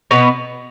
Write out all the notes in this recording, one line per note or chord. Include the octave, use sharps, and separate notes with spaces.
B2 B3